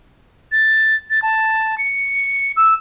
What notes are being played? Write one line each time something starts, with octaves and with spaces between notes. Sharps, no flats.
A6
A6
A5
C#7
E6